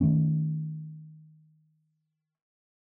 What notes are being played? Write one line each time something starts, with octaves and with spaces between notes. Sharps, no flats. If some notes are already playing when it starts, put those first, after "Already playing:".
D#3 F3 A3 C#4